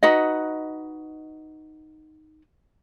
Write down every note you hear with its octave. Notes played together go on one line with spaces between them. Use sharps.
D#4 F#4 B4 D#5